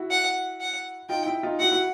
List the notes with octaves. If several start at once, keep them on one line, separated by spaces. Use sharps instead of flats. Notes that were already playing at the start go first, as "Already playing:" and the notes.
Already playing: E4 F#4
F#5
F#5
D#4 F4 G5
E4
D#4 F4
E4 F#4 F#5
E4 F#4